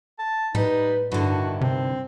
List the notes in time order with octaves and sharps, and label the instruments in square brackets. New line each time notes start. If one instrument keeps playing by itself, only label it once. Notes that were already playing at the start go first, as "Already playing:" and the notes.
[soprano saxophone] A5
[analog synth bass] A2 [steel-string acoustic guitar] G3 [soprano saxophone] D#4 [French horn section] B4
[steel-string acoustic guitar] G2 D3 [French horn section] D#3 D#4 E4 [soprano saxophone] F#4
[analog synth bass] C3 [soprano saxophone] C4